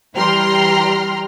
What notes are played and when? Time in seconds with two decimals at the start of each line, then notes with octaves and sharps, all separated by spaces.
0.16 E3 G3 G5 A#5 C6 F6